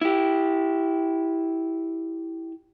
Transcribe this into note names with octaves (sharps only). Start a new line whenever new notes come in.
E4 G4